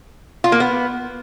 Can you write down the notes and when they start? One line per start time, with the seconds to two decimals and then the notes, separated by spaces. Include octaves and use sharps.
0.44 F4
0.52 A#3
0.60 B3